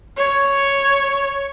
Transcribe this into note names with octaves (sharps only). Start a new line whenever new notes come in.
C#5